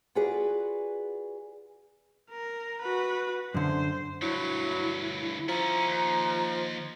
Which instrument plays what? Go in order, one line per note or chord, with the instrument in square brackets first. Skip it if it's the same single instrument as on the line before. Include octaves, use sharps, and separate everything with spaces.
[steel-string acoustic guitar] F4 F#4 G#4 B4 D5
[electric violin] A#4
F#4 B4
[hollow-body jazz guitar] F#2 D3 [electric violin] C5
[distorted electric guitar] D2 G2 [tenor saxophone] F#3 [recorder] E4
[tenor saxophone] F3 [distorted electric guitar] C#4 E4 [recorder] A#5
[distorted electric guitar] D#2